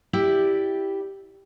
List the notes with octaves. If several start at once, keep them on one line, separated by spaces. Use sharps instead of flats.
E4 G4 D5